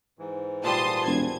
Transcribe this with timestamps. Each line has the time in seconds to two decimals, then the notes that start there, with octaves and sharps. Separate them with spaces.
0.19 G#2 E3
0.64 A#2 G3 A5 C6 D#6
1.06 E1 G#6